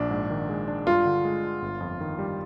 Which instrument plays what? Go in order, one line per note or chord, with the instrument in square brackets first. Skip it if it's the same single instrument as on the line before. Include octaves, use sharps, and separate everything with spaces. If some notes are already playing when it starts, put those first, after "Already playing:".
Already playing: [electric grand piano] A#1 [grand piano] D4
[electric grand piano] G#2
D#3
G#3
D4
[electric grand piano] G2 [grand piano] F4
[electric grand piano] D3
G#3
D4
G1
F2
D#3
G3